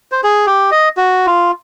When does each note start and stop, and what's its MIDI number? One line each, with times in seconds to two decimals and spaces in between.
0.12 0.21 72
0.24 0.46 68
0.47 0.70 67
0.71 0.89 75
0.97 1.26 66
1.26 1.51 65